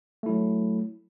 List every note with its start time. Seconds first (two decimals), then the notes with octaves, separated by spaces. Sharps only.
0.23 A3
0.26 E4
0.29 F#3